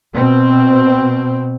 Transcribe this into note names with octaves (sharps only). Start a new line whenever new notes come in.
B2 C4